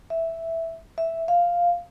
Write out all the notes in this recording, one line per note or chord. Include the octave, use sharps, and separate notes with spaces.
E5
E5
F5